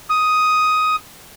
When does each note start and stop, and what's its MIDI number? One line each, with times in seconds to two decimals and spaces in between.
0.10 0.96 87